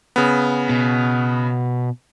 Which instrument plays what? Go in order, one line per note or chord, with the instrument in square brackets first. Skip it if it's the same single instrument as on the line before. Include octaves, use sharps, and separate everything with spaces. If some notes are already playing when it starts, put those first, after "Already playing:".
[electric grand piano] C#3 B3
[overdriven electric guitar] B2